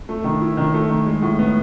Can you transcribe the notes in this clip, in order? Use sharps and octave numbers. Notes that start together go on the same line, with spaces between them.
A3
D#3
E4
D#3
A3
D#3
G#3
A2
B3